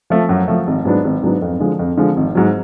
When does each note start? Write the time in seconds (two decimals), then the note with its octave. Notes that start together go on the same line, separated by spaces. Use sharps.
0.10 F3 A3
0.29 F#2
0.48 F3 A3
0.67 G#1
0.85 G#2 F#3 B3 D4
1.04 G#1
1.23 G#2 F#3 B3 D4
1.42 F2
1.60 D3 F3 G#3
1.79 F2
1.97 D3 F3 G#3
2.16 G#1
2.35 G#2 F#3